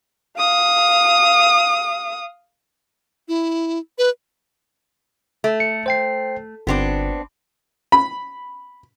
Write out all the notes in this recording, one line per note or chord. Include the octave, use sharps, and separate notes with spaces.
F5 D#6
E4
B4
A3
C#7
C5 G5 C7
G1 B3 C4 D4
B5